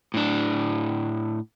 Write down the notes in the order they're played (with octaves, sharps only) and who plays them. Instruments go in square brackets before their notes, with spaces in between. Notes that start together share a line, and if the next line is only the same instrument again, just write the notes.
[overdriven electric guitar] A2 D4